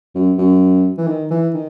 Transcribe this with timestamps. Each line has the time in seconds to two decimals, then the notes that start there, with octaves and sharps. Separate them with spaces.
0.15 F#2
0.38 F#2
0.98 E3
1.07 D#3
1.31 E3
1.54 D#3